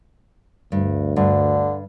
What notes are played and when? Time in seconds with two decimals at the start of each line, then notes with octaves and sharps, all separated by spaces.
0.72 D2 G2
1.16 G2 D3